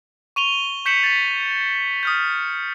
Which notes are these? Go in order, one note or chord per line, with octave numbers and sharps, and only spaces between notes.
C#6 D#7 F7 G7
C#6 G6 B6 C#7 E7 F#7
A6 B6
D#6 F6 G6